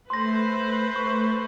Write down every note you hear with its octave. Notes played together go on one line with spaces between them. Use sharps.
A3 B4 C5 C6 A#6
A3 C#6